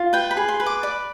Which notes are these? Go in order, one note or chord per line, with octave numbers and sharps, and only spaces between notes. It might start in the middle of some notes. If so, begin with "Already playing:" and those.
Already playing: F4
B4 G5
B5
G#4
C6
B4
D6
D5 B5